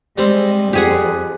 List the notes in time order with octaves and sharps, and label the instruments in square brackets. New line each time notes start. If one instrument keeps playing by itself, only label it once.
[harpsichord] G3 C4 [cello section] G#3
[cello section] F2 [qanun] G4 G#4 F#5